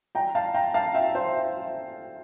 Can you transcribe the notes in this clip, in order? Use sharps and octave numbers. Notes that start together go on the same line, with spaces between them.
G5 A#5
F5 A5
G5 A#5
F5 A5
E5 G5
C5 E5